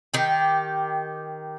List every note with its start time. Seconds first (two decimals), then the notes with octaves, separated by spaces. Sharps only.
0.14 D#3 G4